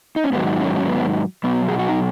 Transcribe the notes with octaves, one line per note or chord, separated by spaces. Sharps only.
D#4
C#4
G#2 D#3 F#3 B3
C#4
C#4
B3
B2 F#3 B3
G#4
F#4
D#4